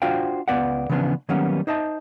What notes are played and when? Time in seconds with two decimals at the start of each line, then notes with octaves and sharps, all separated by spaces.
0.02 D4 F4 F#4 C5 F5 G5
0.48 C#2 B3 B4 D5 F5 F#5
0.89 C#3 E3 F3 B3 C#4 D4
1.29 D#3 F#3 G3 A#3 B3 C#4
1.67 D#4 C5 D#5 E5 A5